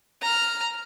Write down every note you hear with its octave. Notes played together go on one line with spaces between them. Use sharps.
A#5 F6